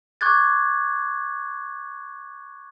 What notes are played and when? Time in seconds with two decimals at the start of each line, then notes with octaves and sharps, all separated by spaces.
0.21 C#6 D6 F#6 G#6 A6